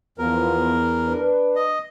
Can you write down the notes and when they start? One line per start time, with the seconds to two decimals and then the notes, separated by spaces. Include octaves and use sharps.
0.18 E2 F3 B3 A#4
1.06 D4 B4
1.55 D#5